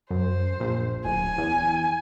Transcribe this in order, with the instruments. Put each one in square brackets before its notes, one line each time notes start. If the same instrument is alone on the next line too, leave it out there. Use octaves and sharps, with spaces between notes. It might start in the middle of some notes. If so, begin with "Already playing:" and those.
[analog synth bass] F#2 [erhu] C5
[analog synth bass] A#1
[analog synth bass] D1 [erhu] G#5
[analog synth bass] E2